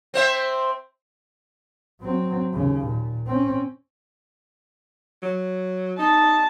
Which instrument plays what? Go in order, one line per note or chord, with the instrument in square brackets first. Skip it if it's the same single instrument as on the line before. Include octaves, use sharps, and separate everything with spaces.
[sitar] C4 C5 E5
[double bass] F#3 C4
D#2 C#3
A#2
C4 C#4
[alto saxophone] F#3
[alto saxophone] D#4 [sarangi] A5